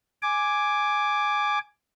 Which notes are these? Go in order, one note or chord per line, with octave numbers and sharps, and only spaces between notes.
G#5 D6